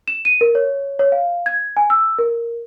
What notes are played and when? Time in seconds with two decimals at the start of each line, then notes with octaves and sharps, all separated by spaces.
0.08 E7
0.25 D#7
0.41 A#4
0.55 C#5
0.99 C#5
1.12 F5
1.46 G#6
1.77 G#5
1.90 E6
2.19 A#4